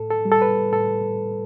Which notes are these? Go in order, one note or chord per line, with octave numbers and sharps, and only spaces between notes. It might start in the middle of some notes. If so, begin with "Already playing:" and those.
Already playing: A2 A4
A4
G3
A4
B4
A2 A4